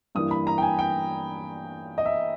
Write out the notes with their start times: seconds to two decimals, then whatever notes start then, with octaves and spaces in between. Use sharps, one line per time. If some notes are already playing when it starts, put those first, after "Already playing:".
0.15 G2 E3 A#3 E4 D#6
0.31 B5
0.47 A#5
0.58 G5
0.62 G#5
0.79 G5
1.98 D#5
2.06 E5